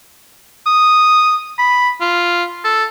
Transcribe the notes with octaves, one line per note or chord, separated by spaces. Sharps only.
D#6
B5
F4
A4